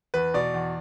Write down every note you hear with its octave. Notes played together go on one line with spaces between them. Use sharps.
E2 B4
B2 D5
E2